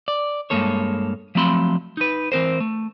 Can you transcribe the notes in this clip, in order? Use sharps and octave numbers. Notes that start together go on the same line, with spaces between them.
D5
G2 G#3 A#3 A4 C#5
F3 F#3 A3 C4 B5 C6
D#4 B4
E3 C4 A#4 C5
A3